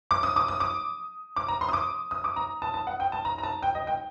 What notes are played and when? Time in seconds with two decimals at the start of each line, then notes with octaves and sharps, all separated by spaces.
0.11 D6
0.23 D#6
0.36 D6
0.48 D#6
0.60 D6
1.36 D6
1.48 A#5
1.61 C6
1.69 D#6
1.73 D6
2.11 D#6
2.24 D6
2.36 A#5
2.62 A5
2.74 A5
2.87 F#5
3.00 G5
3.12 A5
3.25 A#5
3.38 A#5
3.43 A5
3.62 G5
3.75 D#5
3.87 G5